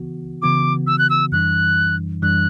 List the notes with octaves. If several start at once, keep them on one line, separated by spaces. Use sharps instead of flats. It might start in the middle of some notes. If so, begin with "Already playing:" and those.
Already playing: C#3 E3 B3 F#4
C#3 E3 B3 F#4 D6
E6
F#6
E6
F#2 E3 G3 D4 F#6
F#2 E3 G3 D4 F#6